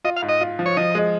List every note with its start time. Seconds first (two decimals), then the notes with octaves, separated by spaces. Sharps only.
0.04 F4 D#5
0.16 F5
0.22 G#2
0.29 D#5
0.41 F4
0.59 F3
0.66 C#5
0.77 F3 D#5
0.95 G#3